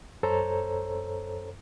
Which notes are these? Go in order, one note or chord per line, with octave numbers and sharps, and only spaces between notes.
F#2 A4 C5 C#5 A#5